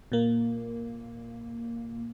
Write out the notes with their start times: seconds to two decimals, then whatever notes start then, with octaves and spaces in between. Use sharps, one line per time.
0.12 A#2 A#3